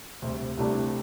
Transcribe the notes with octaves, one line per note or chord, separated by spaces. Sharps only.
D2 C3 G3
C2 C3 A3 D4